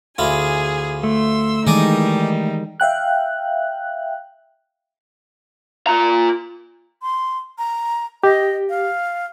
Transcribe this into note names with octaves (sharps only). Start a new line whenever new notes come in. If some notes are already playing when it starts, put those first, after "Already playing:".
D2 E4 F4 G#4 G#5
A3 C6 E6
D#3 E3 G3 G#3 D#4 G#4 D5 D#5
E5 F5 G5 F#6
F4 A#5
C6
A#5
G4 D#5
F5